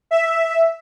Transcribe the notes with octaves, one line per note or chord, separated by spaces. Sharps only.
E5